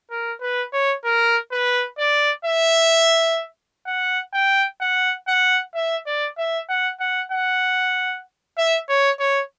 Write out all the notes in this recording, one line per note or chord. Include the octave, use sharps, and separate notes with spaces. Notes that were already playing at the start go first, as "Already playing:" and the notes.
A#4
B4
C#5
A#4
B4
D5
E5
F#5
G5
F#5
F#5
E5
D5
E5
F#5
F#5
F#5
E5
C#5
C#5